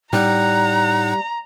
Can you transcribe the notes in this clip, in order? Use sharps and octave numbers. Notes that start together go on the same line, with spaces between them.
A2 G3 D#4 F#5 A#5 F#6